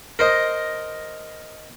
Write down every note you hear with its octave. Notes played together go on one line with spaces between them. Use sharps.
A#4 C5 D#5